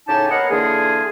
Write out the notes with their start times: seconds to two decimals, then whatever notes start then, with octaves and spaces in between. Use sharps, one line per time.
0.08 A2 C#3 D#4 G4 G#5 A5
0.31 A#3 B3 C#5 D#5 F5 F#5
0.50 D3 E3 A#3 F4 G#4